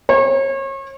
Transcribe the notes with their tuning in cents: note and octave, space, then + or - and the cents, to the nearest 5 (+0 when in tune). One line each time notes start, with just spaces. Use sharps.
C#5 -35